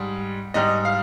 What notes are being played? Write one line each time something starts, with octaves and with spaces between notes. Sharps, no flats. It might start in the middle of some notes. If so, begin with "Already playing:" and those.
Already playing: G#2 G3
G#2 G3 D#5
F5